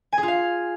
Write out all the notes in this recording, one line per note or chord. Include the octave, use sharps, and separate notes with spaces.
G#5
G#4
F4
F5